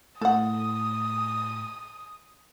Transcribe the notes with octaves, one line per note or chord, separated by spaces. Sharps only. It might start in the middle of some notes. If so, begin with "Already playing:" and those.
A2 A4 F#5 D#6